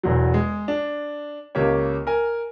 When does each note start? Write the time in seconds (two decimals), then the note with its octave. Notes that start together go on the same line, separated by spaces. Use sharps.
0.03 E1 E2 F#3
0.34 G#3
0.68 D4
1.55 C#2 A#3 G4 C#5
2.07 A#4 G#5